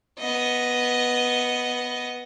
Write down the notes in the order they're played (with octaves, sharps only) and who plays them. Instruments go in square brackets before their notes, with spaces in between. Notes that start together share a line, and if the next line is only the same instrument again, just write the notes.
[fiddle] B3 D#5